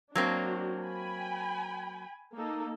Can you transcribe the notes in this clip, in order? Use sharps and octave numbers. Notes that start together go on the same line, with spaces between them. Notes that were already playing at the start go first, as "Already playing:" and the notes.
F#3 A#3 C4 D4 F#4
G5 G#5 B5
A#3 D#4 A4